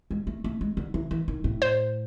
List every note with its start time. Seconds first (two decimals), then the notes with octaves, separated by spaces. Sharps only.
0.11 G#3
0.27 A3
0.44 A3
0.61 G#3
0.77 D3
0.94 E3
1.11 E3
1.28 D#3
1.44 A2
1.62 C5